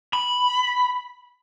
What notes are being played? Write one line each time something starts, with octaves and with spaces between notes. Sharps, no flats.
B5